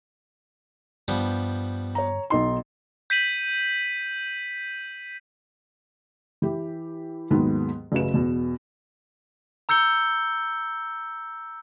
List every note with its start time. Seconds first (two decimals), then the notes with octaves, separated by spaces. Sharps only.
1.08 G2 F3 G3 B3
1.95 C#5 A#5
2.30 B1 D#4 C6
3.10 G6 B6 D#7 F#7
6.42 E3 G4
7.30 D#2 G#2 D#3 F#3 G#3 B3
7.92 A1 F#2 C#3 B4 E7
8.14 E2 B2
9.69 A#5 E6 G6 C#7 G7